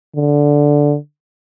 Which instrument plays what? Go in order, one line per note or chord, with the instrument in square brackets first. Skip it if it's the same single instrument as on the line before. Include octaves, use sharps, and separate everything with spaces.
[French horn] D3